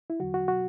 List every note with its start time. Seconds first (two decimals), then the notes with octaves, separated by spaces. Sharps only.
0.10 E4
0.20 E2 D3 F#3 F#4
0.34 F#4
0.48 B2 F#3 F#4